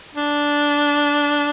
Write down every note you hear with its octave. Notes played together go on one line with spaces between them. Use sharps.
D4